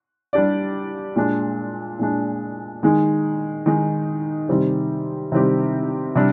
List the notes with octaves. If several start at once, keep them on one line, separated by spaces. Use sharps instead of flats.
G3 D4 G4 D5
A#2 G#3 D4
A#2 G#3 D4
D#3 G#3 D#4
D#3 G#3 D#4
C3 D#3 G3 C4 G4
C3 D#3 G3 C4 G4
C3 G3 D4